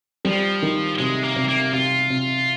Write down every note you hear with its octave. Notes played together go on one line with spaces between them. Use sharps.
F3 G3
D#3
C3 G#3
A#3
C3
A#3
C3 F4
C3